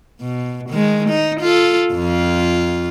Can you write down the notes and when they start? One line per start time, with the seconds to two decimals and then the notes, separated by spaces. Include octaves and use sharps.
0.21 B2
0.69 D#3 G#3
1.09 D#4
1.40 F4 A4
1.94 F2 F4